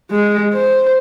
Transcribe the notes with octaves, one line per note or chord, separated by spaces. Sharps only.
G#3
C5